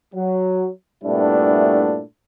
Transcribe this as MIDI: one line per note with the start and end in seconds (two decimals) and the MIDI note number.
0.13 0.68 54
1.04 2.01 43
1.04 2.01 46
1.04 2.01 57
1.04 2.01 59
1.04 2.01 62
1.04 2.01 64